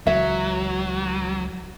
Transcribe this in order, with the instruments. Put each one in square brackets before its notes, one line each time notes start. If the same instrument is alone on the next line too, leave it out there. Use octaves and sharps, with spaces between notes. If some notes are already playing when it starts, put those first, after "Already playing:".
[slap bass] C#2 E3 [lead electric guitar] F#3 [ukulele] E5